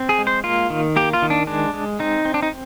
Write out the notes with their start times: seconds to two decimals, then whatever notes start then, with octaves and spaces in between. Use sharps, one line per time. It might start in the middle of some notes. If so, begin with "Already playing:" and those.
Already playing: C4
0.09 G#4
0.18 G#3
0.27 C5
0.44 A#3 F4
0.70 D#3
0.96 A#3 G4
1.13 F4
1.22 D#3
1.30 D4
1.47 G#3 D4
1.74 G#3
1.99 C4 D#4
2.25 C4
2.34 D4
2.43 D#4